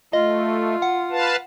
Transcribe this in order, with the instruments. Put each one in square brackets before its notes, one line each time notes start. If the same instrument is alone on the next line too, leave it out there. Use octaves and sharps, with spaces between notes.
[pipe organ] A3 [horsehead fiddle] F4 [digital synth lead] D#5
[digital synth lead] F#5
[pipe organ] B4 F5 A5